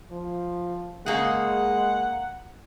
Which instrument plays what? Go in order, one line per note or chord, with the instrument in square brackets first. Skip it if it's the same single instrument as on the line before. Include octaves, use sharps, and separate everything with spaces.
[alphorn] F3
[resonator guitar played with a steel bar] C#3 A#3 G#4 [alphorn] G#3 [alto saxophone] F#5